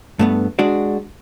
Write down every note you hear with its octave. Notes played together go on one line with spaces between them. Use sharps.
G2 A3 B3
G#3 D4 F#4 D5